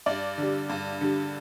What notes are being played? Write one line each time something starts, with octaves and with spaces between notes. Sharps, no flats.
G2 D5
D3 G3
G2
D3 G3